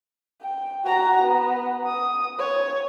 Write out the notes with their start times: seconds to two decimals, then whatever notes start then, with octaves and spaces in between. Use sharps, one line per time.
0.42 G5
0.85 F#4 A#5
1.23 B3
1.87 D#6
2.39 C#5